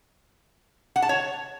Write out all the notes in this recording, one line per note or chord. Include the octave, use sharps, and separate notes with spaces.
F#5
A5
C#5